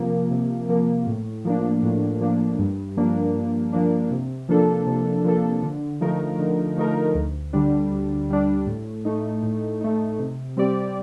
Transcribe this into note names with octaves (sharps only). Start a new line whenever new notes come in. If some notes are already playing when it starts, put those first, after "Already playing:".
Already playing: C3 F3 A#3
C3
F3 A#3
A2
F3 A#3 D4
A2
F3 A#3 D4
G2
F3 A#3 D4
G2
F3 A#3 D4
C3
F3 A#3 D4 A4
C3
F3 A#3 D4 A4
D3
F3 A3 D#4 A#4
D3
F3 A3 D#4 A#4
D2
D3 G3 D4
D2
D3 G3 D4
A2
A3 D#4
A2
A3 D#4
C3
G3 C4 G4 D5